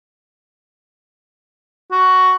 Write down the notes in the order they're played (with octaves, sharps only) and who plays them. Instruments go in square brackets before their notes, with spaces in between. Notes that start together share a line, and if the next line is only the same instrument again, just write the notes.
[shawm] F#4